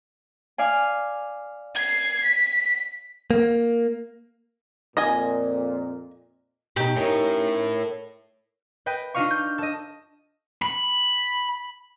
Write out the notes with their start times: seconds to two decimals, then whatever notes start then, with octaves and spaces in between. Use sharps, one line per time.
0.58 D5 F5 G#5
1.75 G#6 C7
2.23 B6
3.31 A#3
4.97 F2 A#2 D#5 G#5
6.76 B2 D#4 G4
6.96 A2 C#4 D#4 A#4 C#5
8.86 B4 D#5 G5
9.14 D4 D#4 F4 D#5 F5 C#6
9.30 G6
9.58 A4 D#5
10.62 B5